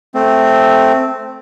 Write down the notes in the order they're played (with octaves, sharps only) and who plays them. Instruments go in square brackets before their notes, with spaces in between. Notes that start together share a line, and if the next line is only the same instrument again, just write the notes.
[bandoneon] A3 C4